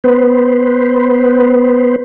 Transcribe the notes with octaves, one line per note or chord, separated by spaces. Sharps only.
B3 B4 C5